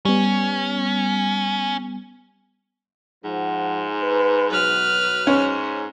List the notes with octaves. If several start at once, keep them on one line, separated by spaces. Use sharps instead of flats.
G3 B3 C#4
G#2 F3 F#5
B4
B1 F#3 B4 F6
G#2 C#4